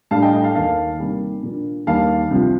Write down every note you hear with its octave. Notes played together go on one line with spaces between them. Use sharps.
A2 G3 D4 F5 A5
D#5 G5
D#5 G5
F5 A5
D#2 D#3 A#3 F5 A5
C3 D#3 G3 A#3
A#2 F3 A#3 D4
D#2 D#3 G3 A#3 F5 A5
C2 C3 F3